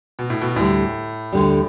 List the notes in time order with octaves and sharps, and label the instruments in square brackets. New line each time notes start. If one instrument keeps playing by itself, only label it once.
[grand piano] B2
A2
B2
[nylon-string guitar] D2 D3 G3 [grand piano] A2
[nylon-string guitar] D2 D3 G3